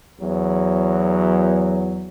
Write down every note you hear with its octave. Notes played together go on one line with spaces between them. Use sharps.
E2 F#3